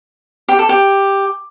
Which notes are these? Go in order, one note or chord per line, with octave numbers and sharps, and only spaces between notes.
G4
A4
G4